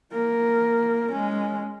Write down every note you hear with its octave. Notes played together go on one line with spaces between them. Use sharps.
A#3 A#4
G#3 C#4